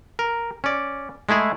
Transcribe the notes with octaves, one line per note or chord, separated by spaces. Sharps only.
A#4
C#4 D5
G#3 A3 E4 G#4